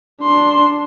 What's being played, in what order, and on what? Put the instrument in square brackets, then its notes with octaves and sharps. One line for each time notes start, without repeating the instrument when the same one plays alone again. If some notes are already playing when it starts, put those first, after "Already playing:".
[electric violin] D4 C6